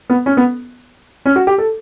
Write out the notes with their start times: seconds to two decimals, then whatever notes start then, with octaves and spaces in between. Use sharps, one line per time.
0.10 B3
0.26 C#4
0.37 B3
1.26 C#4
1.36 F#4
1.47 G4
1.58 A4